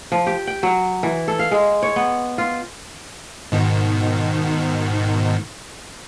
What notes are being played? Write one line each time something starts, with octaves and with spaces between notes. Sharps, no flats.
F3
G4
G5
F#3
E3
A4
F5
G#3
C#5
B3
F4
G#2 B2 D#3